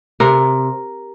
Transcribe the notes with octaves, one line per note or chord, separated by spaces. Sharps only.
C3 A#4